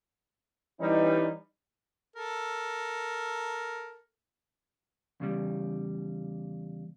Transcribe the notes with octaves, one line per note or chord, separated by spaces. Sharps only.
E3 G3 C#4 D#4
A4 A#4
E2 C#3 G3